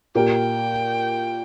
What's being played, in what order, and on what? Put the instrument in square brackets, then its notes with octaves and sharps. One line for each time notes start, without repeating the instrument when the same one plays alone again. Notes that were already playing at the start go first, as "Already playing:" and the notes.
[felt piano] A#2 A#3 G4 [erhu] G5